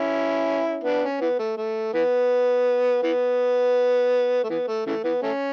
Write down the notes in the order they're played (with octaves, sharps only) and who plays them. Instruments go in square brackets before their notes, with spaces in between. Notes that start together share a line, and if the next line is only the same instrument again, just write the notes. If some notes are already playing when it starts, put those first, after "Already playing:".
Already playing: [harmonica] C#4 E4
B3 D4
C#4
E3 B3
A3
A3
E3 B3
E3 B3
A3
E3 B3
A3
C#3 E3 A3
E3 B3
A3 C#4